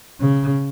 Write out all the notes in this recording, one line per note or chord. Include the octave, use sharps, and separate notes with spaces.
C#3